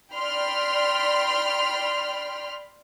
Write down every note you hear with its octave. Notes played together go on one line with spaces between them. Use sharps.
D5 G5 B5 C6 F6